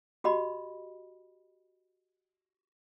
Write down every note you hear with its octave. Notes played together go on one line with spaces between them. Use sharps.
F#4 G4 D#5 B5